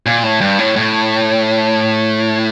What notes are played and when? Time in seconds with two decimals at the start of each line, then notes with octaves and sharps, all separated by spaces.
0.06 A#2
0.23 A2
0.41 G2
0.59 A2
0.76 A2